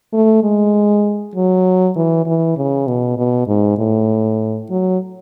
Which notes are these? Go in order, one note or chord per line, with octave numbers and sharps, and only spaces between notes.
A3
G#3
F#3
E3
E3
C#3
B2
B2
G#2
A2
F#3